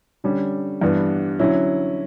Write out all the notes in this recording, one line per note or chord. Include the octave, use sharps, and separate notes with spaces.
D3 G3 C#4
G2 E3 B3 D4
D3 F#3 C#4 E4